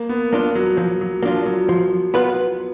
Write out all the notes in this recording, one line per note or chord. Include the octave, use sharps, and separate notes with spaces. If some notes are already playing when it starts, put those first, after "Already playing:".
Already playing: A#3
B3
A#3 D4 F4
F#3
F3 F#3
F#3
F3 A#3 D4 F4
F#3
F3
B3 F4 B4